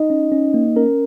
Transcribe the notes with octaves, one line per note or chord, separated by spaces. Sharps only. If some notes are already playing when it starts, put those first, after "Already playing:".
Already playing: D#4 D#5
C#4
C#4
A#3
C#4 A#4